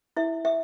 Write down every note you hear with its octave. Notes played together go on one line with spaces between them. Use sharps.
E4 E5
E5